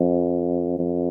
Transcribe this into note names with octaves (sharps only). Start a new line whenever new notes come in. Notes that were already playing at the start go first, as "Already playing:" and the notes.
Already playing: F2
F2